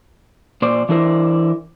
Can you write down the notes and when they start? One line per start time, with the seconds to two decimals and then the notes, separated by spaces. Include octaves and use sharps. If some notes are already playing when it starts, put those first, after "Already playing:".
0.62 A#2 C5 D5
0.89 E3 D4 E4 A#4 C5